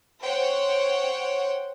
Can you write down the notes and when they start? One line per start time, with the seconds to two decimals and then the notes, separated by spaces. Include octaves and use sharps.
0.24 C5 C#5 F#5 G5